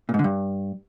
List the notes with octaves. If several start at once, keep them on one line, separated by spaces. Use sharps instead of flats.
A#2
G#2
D3
G2